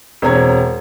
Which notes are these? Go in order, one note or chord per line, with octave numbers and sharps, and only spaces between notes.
E1 C4 C#5 A#5 G#6